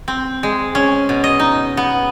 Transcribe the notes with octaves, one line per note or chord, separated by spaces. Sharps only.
C4
G#3
C#4
B2
D#5
D#4
B3